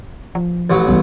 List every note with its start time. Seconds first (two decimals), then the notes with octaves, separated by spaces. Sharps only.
0.35 F3
0.70 A1 F#3
0.88 C2 E3 G3 B3